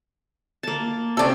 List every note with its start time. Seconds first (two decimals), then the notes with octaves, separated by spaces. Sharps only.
0.63 A#3 A5
1.17 C3 C#4 A4 D5